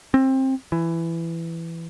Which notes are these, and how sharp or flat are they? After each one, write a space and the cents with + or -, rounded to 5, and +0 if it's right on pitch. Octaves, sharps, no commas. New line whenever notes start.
C4 +20
E3 +15